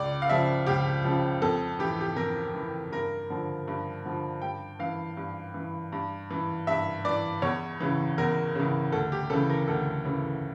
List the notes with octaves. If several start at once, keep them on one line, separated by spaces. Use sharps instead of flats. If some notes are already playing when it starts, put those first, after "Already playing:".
Already playing: C#2 D5
F5
C#3 F3 E5
C#2 G4
C#3 F3
F2 A4
E3 G4
G4
F2 A#4
E3
G2 A#4
D3 F3
G2
D3 F3
G2 G5
E3 F5
G2
E3
G2
E3
G2 E5
E3 D5
E2 C#5
C#3 E3
E2 A#4
C#3 E3
D2 A4
G4
C#3 E3 A4
A#4
D2 A4
C#3 E3